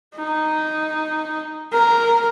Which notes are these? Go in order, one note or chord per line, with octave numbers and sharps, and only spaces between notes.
D#4
A#4